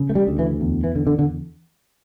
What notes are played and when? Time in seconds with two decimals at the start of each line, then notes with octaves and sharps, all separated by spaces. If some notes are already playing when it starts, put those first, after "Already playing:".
Already playing: C#3
0.09 A3
0.15 G3
0.27 D2
0.39 E3
0.61 E2
0.84 E3
0.95 D3
1.07 D3
1.19 D3